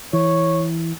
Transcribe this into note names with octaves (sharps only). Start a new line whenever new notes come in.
E3 C#5